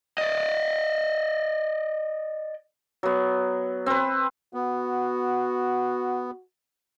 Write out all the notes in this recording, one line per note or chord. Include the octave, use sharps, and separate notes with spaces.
D5 D#5
F#3 B3
C4 B4
B3 F#4